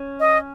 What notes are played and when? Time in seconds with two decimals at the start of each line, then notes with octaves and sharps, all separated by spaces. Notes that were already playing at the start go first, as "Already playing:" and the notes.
Already playing: C#4
0.20 D#5